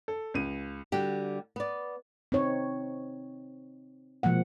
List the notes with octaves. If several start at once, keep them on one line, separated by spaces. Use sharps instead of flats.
A4
C#2 D#7
D3 G3 F#4 G4
B3 D5
C4 D#4 C#5
B2 F3 G#3 A#3 F#5